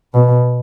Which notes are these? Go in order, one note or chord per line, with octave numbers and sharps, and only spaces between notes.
B2